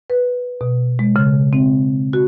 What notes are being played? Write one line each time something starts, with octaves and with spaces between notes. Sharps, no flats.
B4
B2
G#3
C#3
C4
F#4